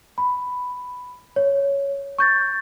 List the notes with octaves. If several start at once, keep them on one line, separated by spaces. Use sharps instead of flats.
B5
C#5
C#6 G6 A6